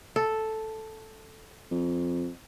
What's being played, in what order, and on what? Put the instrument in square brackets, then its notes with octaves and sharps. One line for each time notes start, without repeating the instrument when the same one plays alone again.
[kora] A4
[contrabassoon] F2